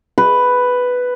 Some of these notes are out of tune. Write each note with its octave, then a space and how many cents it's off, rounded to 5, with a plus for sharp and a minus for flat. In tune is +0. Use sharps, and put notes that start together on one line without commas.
B4 +5